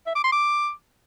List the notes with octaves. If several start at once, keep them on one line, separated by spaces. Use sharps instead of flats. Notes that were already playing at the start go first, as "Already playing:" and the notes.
E5
D6
C6
D6